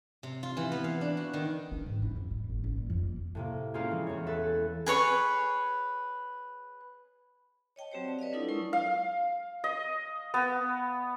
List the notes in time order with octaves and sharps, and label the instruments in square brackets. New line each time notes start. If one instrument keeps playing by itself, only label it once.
[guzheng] C3
F4
E3
B3
F5
D4
F#4
D#3
[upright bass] D4
G#2
E4
F2
A2
G#1
A1
A#2
F2
A#3
[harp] A2 C3 A#3
G#3 A#3 C4 C#4 F4 G#4
E3
E2 C#5
A4 B4 E5
[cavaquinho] G#4 B4 C#5 C#6
[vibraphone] C#5 D#5 G5 A5
F#3 C4 F#4 G4 C5 C#5
D5 A5
B4 D5 D#5 F5
F#3 D4 E4 F4 A4 D#6
F#3 G#3 D4 E4 A#4 C#6
[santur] F5
D#5
B3